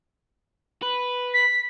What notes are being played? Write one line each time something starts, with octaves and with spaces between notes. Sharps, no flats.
B4
B6